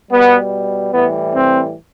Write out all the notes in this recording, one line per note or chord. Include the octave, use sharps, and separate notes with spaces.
B2 G3 B3
A2 E3 G3 B3
C4